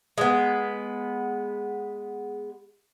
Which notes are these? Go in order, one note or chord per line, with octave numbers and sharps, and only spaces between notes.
G#3 B3